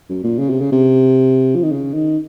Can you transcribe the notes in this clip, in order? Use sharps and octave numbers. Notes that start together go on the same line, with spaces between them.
F#2
A#2
C#3
C3
C#3
C3
F3
D#3
C#3
D#3